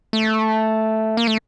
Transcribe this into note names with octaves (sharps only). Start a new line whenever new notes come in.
A3
A#3
A3